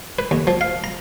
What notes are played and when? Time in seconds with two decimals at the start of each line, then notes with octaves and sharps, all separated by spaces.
0.19 B4
0.31 D#2
0.47 F3
0.61 F5
0.84 A#5